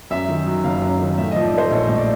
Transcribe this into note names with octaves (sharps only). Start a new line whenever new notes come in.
F#2 E5
D#3
F#3
F#1 F5
F#2
D#3
A2 E5
F3 D#5
D5
A3 C5
A#1 C#5
A2
D5